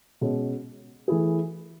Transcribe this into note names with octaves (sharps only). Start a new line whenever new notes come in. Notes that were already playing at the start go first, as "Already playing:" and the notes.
B2 G#3 C#4
E3 A3 E4 G#4